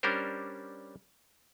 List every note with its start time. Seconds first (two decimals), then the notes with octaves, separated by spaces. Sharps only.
0.03 G3 C#4 D4 A#4 C5